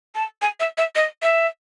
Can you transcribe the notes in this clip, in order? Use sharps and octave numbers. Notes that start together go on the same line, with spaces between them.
A5
G#5
E5
E5
D#5
E5